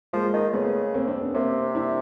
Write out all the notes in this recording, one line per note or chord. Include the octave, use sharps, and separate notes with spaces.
F3 G#3 A#3
D#3
C#3 A3 B3
A#3 C4
C4 D4
B3 C#4
C3 A#3 C4
D4 E4